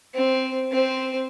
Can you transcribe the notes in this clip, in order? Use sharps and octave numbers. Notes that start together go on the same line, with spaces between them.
C4
C4 C5